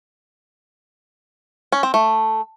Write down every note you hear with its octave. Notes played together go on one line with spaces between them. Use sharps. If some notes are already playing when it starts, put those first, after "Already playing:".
C#4
C4
A3